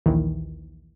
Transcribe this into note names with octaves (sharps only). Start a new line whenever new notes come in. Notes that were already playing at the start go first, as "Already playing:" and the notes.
A#1 D#2 D#3 E3